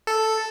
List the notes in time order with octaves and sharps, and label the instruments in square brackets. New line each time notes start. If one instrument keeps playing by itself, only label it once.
[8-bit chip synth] A4